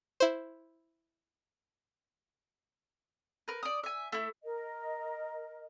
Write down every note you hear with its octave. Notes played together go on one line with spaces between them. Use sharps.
E4 C5
A#4 B4
D5 D#6
E5 G#5
A3 E4
A#4 D#5